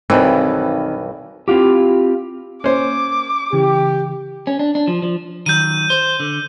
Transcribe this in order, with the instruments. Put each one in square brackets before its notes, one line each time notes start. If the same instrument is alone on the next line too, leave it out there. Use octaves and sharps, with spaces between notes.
[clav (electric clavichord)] B1 G2 E3 [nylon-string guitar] D#3 B3 C4
[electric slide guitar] C4 E4 F4 G4
[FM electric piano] A#3 [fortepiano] C#4 C5 [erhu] D6
[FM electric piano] C#3 E3 [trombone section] G4
[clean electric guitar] C#4
D4
D4
F3
F3
[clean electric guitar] D#3 F#3 [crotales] G6 D#7
[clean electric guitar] C5
D3